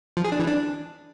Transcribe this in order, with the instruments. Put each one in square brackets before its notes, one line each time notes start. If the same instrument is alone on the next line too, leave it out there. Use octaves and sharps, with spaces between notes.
[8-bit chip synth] F3
G#4
D4
E3
D4